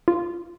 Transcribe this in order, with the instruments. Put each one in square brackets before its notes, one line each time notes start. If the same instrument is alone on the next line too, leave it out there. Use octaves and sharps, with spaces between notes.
[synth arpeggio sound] F4